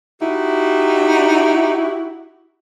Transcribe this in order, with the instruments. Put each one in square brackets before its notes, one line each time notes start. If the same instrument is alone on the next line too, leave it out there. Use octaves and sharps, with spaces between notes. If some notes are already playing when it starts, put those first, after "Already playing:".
[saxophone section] D#4 E4 F#4 G4